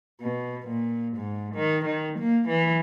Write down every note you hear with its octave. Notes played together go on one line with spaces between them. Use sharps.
B2
A#2
G#2
D#3
D#3
A#3
E3